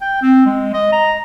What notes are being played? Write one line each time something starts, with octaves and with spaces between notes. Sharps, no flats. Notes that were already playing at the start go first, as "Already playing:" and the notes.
G5
C4
G#3
D#5
A#5